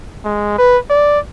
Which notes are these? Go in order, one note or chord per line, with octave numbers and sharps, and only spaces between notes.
G#3
B4
D5